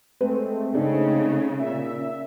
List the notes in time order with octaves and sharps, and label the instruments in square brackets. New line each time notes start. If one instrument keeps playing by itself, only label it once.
[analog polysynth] G#3 A3 C4 [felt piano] B4
[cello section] C#3 [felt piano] D4 G#4 [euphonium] D#4
[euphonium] A#2 [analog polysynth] E5